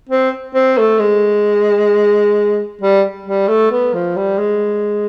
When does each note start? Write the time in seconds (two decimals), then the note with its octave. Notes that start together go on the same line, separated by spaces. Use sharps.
0.09 C4
0.54 C4
0.78 A3
0.99 G#3
2.81 G3
3.26 G3
3.48 A3
3.71 B3
3.94 F3
4.16 G3
4.38 G#3